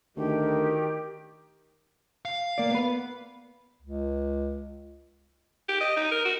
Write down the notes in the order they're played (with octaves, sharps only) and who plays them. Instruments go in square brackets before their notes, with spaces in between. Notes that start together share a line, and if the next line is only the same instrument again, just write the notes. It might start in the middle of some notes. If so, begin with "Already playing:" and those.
[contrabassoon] D2 [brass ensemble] D#3 [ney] G4
[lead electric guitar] F5
[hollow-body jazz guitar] A#3 D5
B3 B4
[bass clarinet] C#2
[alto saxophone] G4
D#5
D#4
A#4
F#4